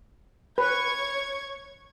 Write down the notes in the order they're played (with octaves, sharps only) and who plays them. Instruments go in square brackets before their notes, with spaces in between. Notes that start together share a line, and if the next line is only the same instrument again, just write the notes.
[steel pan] B4 [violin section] C#5 C#6 G#6